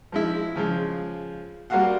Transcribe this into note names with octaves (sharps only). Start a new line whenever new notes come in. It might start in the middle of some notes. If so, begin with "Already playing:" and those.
F3 G#3 E4
C#3 F3 G#3
G3 A#3 F4 F#4 F5 F#5